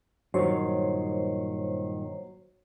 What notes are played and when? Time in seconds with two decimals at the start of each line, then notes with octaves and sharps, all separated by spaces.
0.34 G2 A#2 D#3 F#3 C5 C#5